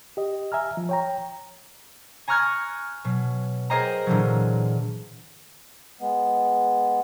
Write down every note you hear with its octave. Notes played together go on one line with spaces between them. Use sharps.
G4 D#5
E5 G#5 A#5 F6
F3
C#5 G5 A#5
G#5 A#5 C#6 F6 F#6 G#6
B2 F#3
G#4 A#4 C5 D#5 G5 A#5
A#2 D3 E3 F#3
G#3 B3